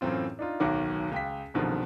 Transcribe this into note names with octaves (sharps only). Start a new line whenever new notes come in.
F#2 A2 E3 C4 F4
D4 D#4 F4
D1 B1 D#3 F#4 C#5 D6
C#2 G5 B6
F#1 C2 B2 D3 D#3 F3